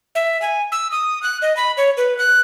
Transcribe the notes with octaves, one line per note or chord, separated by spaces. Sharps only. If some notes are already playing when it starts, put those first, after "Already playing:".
E5
G#5
E6
D#6
F#6
D#5
B5
C#5
B4
F#6